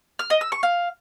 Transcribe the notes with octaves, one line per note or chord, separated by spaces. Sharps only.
F6
D#5
E6
C#6
F5